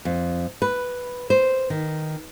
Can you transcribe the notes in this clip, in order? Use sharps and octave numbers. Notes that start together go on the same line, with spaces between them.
F2
B4
C5
D#3